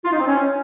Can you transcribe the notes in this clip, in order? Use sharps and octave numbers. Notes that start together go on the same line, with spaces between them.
F4
D#4
C4
C#4